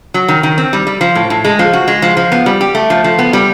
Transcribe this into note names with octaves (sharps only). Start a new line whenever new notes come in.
F#3
D#3
D#3
C4
G3
G3
F3
A2
A2
G#3
F3
F#4
G#3
F3
F3
B3
G3
G4
A3
F3
F3
B3
G3